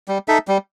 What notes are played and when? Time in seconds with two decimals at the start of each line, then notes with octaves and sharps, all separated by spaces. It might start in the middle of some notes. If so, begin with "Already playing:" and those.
0.08 G3
0.28 D#4 A4 E5
0.48 G3